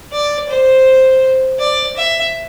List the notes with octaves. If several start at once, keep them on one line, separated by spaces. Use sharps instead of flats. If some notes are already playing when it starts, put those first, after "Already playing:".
D5
C5
D5
E5